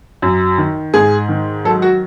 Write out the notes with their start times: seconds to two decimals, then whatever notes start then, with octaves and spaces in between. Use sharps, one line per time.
0.22 F#2
0.58 D#3
0.94 G#2 G#4
1.29 D#3
1.65 F#3 A4
1.82 F#4